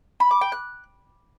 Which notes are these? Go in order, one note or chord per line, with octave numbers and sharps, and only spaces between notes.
B5
D6
G5
F#6